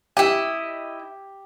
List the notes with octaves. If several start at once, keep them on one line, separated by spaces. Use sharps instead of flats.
E4 G4 D#5